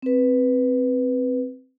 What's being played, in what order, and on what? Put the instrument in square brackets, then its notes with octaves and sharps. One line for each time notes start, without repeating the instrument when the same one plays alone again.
[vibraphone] C4 B4